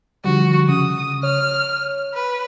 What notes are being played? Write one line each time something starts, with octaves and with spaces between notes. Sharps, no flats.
D3 F3 G3 F#4
C#3 D#6
C#5 F6
B4